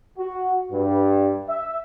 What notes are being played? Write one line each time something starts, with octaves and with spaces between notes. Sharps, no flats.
F#4
G2
E5